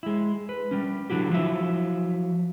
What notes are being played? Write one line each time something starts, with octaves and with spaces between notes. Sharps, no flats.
G#3 E4
B4
G3 C#4
D3 F#3 E4 F#4 G4
F3 F#3 E4 E5